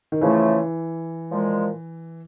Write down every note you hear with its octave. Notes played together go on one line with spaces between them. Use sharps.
D#3
C#3 E3 F3 A3
A#2 F3 G#3